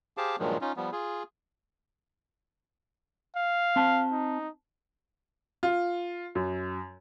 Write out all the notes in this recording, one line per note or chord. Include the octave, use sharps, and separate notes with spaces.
G4 G#4 C5 F5 A5 D6
G2 A#2 D#3 F3 F#3 G#3
C#4 D#4 F4
F3 G3 B3
F4 G#4
F5
C4 A5
D#4
F4
F#2